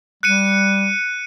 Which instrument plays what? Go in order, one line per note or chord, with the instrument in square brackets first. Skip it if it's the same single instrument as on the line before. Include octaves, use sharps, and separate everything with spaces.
[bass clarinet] G3 [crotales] F#6 C#7 D#7